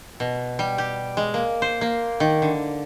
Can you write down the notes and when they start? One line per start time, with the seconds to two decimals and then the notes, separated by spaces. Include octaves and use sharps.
0.20 B2
0.59 G3
0.78 G4
1.17 G#3
1.34 A#3
1.62 C5
1.81 A#3
2.20 D#3
2.42 D3